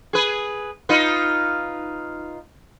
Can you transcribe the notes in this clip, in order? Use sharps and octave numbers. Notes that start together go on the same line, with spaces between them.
G#4 B4
D#4 F4 B4